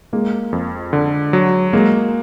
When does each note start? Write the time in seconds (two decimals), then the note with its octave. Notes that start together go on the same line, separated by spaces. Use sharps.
0.13 G#3 A#3
0.53 F2
0.93 D3
1.33 F#3
1.73 G#3 A#3